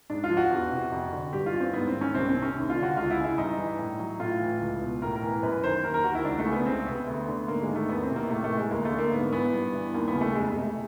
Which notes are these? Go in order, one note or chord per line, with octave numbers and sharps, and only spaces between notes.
G#2 D4
F4
F3
F#4
E2
C3
F2
D3
G2 G4
F4
E3
C4
G#2 B3
C4
D#3
C#4
C2 C4
C4
C3
C#4
D#2
F4
D3
F#4
C#2 F4
E4
C#3
E4
G2 D#4
E3
A2
F#3
A2 F4
E3
C#2
B2
A2 A#4
A#4
E3
A#4
F#2 B4
D#3 C5
D#2 A#4
A#4
D#3 F#4
E4
C#2 D4
A3
C#3
B3
C#2 C4
C3 B3
D2
D3
G#2 A#3
G#3
D#3
A3
E2 B3
C4
C3
A#3
A2 A3
A3
E3
G#3
D2 A#3
A3
D3
A#3
G#2 B3
E3 B3
G2
E3
D#2 A#3
B3
C#3
A3
F2 G#3
G#3
C3
A3